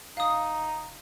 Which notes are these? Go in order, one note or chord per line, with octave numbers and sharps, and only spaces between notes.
E1 D#4 F5 D#6